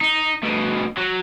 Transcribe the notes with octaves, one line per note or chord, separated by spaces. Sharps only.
D#4
D2 B2
F#3